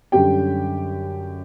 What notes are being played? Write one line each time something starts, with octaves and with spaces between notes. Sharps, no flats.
F#2 D3 G3 C#4 G4 G5